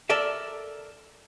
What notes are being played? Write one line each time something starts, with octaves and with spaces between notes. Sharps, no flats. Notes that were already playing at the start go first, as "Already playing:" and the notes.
A4 A#4 D5 E5